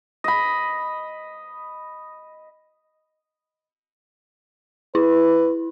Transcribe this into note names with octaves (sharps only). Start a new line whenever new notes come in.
D#5 B5
E4 B4